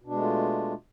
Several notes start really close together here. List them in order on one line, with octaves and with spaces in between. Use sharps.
B2 D4 G#3 A3 F4